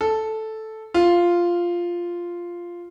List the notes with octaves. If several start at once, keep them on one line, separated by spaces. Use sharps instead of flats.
A4
F4